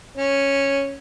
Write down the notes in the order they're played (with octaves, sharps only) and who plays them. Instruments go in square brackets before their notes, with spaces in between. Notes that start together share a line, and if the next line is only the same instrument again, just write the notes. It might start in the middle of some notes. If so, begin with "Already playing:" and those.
[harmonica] C#4